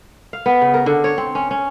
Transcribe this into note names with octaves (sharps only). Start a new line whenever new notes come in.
F5
B3
C#3
A#4
D3
C#5
C4
C#4
C#4